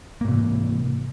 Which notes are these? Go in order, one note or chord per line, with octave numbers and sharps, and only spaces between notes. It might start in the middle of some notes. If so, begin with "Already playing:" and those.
G#2 C3 E3 A#3